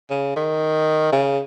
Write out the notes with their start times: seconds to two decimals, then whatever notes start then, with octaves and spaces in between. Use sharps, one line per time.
0.10 C#3
0.36 D#3
1.12 C#3